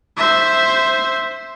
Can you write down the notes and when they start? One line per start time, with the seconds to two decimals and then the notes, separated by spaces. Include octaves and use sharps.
0.17 C5 E5